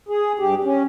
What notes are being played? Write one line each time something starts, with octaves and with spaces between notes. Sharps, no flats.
G#4
G2 G4
C#4